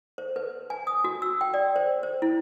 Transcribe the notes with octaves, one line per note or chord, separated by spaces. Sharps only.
C5
B4
G#5
D#6
F#4
E6
G5
D5
C5
C5
E4